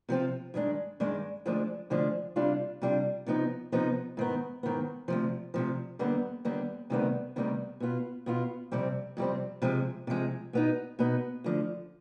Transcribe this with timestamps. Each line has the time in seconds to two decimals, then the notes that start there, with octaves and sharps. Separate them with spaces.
0.09 C3 F3 C4 F4
0.54 G2 D#3 G#3 D4
1.00 G2 D#3 G#3 D4
1.45 D2 D3 F3 G#3 D4
1.90 D2 D3 F3 G#3 D4
2.36 C3 G3 D4 F4
2.82 C3 G3 D4 F4
3.26 C3 F3 B3 D#4
3.72 C3 F3 B3 D#4
4.17 G#2 D#3 B3
4.63 G#2 D#3 B3
5.08 D2 C3 F3
5.54 D2 C3 F3
5.99 D#2 D3 G3 B3
6.45 D#2 D3 G3 B3
6.90 D2 C3 D#3 G3 B3
7.36 D2 C3 D#3 G3 B3
7.80 B2 B3 F4
8.26 B2 B3 F4
8.71 F2 C3 G3 C4
9.17 F2 C3 G3 C4
9.62 C3 F3 G#3
10.07 C3 F3 G#3
10.53 B2 B3 D#4
10.99 B2 B3 D#4
11.44 D2 D3 F3